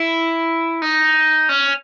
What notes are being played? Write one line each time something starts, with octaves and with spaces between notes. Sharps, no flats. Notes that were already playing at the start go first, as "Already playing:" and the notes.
Already playing: E4
D#4
C#4